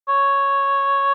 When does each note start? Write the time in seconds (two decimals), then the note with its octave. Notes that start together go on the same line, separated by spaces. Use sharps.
0.08 C#5